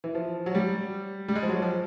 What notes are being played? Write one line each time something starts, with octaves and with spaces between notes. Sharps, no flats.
E3
F3
F#3
G3
G3
G#3
F3
F#3
F3